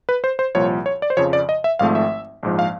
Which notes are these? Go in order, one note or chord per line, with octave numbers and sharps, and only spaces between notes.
B4
C5
C5
C2 A#2 F3 C#5
C#5
D5
C5
F2 C#3 F3 C#5
D5
D#5
E5
G#1 G#2 F3 A3 C4 F5
E5
A#1 G#2 F3
F5